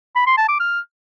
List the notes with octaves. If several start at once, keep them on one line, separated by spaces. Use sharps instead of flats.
B5
C6
A5
D6
F6